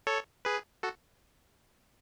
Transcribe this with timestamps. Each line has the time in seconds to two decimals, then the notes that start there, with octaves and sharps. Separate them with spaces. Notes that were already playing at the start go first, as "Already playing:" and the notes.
0.07 A4 C#5
0.45 G#4 B4
0.83 F#4 A4